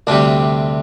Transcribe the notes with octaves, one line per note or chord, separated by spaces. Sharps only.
D2 C3 G3 D4